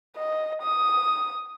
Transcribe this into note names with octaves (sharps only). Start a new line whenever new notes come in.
D#5
D#6